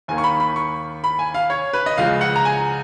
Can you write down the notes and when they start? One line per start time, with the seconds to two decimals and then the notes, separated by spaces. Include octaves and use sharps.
0.08 D#2 D#3 A#3 G#5
0.18 C#6
0.24 B5
0.40 B5
0.56 C#6
1.04 B5
1.19 G#5
1.34 F5
1.50 C#5
1.73 B4
1.86 D#5
1.98 C#2 C#3 F3 G#3 F5
2.21 F#5
2.36 A#5
2.45 G#5